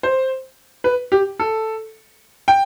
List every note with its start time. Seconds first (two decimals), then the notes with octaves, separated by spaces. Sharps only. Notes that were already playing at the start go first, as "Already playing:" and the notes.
0.03 C5
0.84 B4
1.12 G4
1.39 A4
2.48 G5